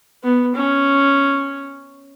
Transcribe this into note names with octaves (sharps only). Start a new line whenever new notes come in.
B3
C#4